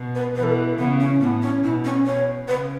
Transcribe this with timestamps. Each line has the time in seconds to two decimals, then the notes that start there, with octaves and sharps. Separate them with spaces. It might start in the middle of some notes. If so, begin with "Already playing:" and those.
Already playing: B2
0.15 B4
0.36 B2 E3 B4
0.43 A4
0.52 B4
0.78 C#3 B3
1.00 C#4
1.21 A2 B3
1.42 C#4
1.63 B2 E4
1.85 C#4
2.06 B2 C#5
2.48 C#3 B4